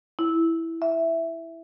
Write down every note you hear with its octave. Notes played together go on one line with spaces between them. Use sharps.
E4
E5